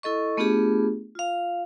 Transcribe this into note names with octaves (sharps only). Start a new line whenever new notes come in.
E4 A4 D#5 C#6
A3 B3 D4 F4 G4 G#4
F4 F5